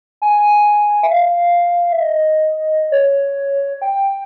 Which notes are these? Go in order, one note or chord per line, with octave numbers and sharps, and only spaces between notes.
G#5
E5
F5
E5
D#5
C#5
G5